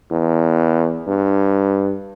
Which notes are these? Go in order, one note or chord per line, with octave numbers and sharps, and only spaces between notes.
E2
G2